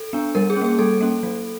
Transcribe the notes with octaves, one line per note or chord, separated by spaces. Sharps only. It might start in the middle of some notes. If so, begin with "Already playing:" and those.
Already playing: A4
B3 D4
G3 A#4
G#4
C#4
A#3 G#4
G3 A4
A#3 C#4
F#3